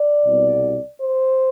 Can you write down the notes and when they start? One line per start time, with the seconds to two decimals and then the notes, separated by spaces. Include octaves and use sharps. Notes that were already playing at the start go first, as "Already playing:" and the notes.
Already playing: D5
0.24 C2 B2
0.99 C5